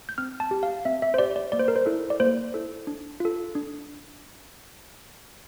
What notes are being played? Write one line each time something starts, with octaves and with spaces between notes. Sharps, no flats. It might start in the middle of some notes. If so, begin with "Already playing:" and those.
G6
C4 F6
A5
G4
F5
C4 E5
E5
C5
G4 D5
D5
A#3 D5
C5
A#4
C5
E4 A4
D5
A#3 C5
E4 A4
D4
F4 A4
D4